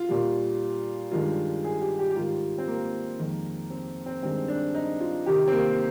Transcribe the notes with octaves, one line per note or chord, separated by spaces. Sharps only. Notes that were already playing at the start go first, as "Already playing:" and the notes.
Already playing: F4
A#2 G3
G2 D#3 G#3 F4
G#4
G4
G4
G4
G#2 D#3 G3 F4
C4
A#3
F2 D#3 G#3
C4
C4
G2 D#3 G#3 C4
D4
D#4
F4
C3 D#3 G3 G4
C4
A#3